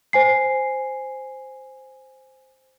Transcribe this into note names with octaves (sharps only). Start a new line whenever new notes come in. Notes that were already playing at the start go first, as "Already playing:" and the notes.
C5 G#5 C7